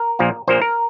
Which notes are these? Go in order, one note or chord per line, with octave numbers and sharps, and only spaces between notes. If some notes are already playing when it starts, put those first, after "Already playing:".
Already playing: A#4
A#1 A#2 F3 A#3
A#1 A#2 F3 A#3 C5
A#4